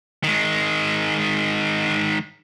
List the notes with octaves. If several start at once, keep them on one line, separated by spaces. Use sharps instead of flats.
D#3 G#3